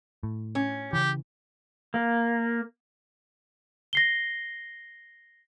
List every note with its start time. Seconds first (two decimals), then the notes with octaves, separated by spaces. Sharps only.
0.23 A2
0.55 C#4
0.93 C#3 E3 G4
1.94 A#3
3.93 A#6 C7 G7